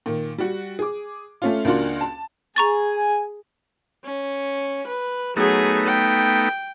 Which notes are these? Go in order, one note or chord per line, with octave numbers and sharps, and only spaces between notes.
A#2 D#3
G3 F#4
G#4 D6
A3 C#4 F4
C#2 A#3 D4 F4 F#4 C6
A5
G#4 G#5 A#5 C#6 A6
C#4
B4
F#3 A3 B3 D#4 G#4
G5